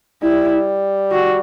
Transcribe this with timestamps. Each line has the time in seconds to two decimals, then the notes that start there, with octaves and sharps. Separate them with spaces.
0.22 G3 E4
1.12 F#4